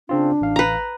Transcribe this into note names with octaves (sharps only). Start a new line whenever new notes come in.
C#3 C4 D4 F4
A1 F5
B4 A#5